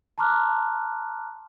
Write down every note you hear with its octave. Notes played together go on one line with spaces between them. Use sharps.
A5 A#5 C6 D6 F6 F#6